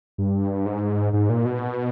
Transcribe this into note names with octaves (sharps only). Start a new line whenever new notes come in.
G2
G#2
G#2
A#2
B2